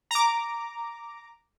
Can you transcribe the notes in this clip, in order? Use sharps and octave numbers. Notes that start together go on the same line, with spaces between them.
A#5 D6